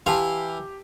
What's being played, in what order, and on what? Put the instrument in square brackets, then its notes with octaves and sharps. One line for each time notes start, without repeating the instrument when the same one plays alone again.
[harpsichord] E3 F5 [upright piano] G4 [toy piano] A5 C6